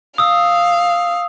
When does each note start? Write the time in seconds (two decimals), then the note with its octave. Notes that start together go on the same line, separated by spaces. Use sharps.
0.18 F5 D#6 E6